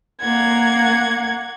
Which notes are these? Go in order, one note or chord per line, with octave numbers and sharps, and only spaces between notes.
A#3 F#5 G#6